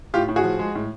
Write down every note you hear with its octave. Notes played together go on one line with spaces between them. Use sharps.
A2 F4 G4
A2
F#4 G#4
F3
G#3
A2